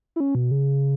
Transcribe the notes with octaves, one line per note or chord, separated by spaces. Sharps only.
E4
C#4
B2
C#3